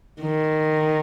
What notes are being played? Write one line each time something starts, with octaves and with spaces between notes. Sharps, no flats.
D#3